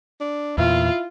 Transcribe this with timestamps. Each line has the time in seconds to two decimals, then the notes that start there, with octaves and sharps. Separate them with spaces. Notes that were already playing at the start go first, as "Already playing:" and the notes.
0.20 D4
0.58 E2 A#2 E4 F4